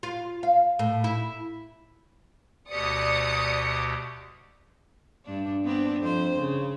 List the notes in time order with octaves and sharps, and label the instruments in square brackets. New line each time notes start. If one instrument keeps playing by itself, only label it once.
[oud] F4
F5
A2
E4
[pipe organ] D2 B2 G4 [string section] D5 D#6 C#7
[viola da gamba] G2 D4
B3 C4 D4
F2 C5
C#3